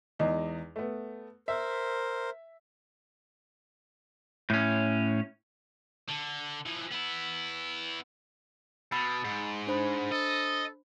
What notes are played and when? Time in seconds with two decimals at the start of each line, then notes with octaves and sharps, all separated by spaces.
0.19 E2 G#3 D#4
0.76 A3 B3
1.48 A#4 C5 E5
4.50 A2 C#4
6.09 D3
6.66 E3 F3
6.91 B3 E4
8.92 B2 B5 E6 A6
9.25 G#2
9.67 D4 C5 B5
10.12 A4 D#5